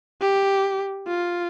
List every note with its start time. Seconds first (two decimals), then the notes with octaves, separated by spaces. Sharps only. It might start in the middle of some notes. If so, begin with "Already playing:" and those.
0.22 G4
1.07 F4